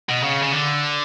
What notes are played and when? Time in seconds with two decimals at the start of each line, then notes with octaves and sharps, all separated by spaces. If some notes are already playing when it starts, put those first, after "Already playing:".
0.09 B2
0.23 C#3
0.42 C#3
0.52 D3